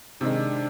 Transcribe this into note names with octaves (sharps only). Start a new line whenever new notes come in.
C3 D#3 G#3 D4